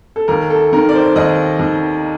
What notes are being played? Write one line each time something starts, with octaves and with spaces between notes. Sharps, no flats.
A4
D#2 A#4
A4
D#3 A#4
D5
C5
D#2 D#5
D#2